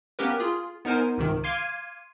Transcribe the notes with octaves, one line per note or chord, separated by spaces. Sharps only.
A#3 B3 C#4 G4 A#4 B4
F4 G#4
B3 D#4 A#4 C5 G#5
C#2 G#2 C3 D#3
F5 C6 D6 G#6 D#7